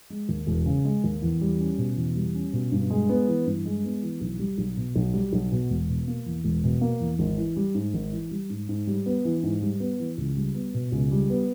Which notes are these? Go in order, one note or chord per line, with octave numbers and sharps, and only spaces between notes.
G#3
D#2
E1
C#3
G#3
D#2
E2
G3
C#4
B2
E2
G3
C#4
B2
G2
G#3
B3
E3
G2
G#3
B3
E3
B1
G3
B1
B2
B1
G3
B1
B2
E1
B2
A#3
E2
E1
B2
A#3
E2
G#1
E3
G3
G#2
G#1
E3
G3
G#2
G#2
G3
B3
E3
G#2
G3
B3
E3
C#2
G3
B3
B2
C#2
G3
B3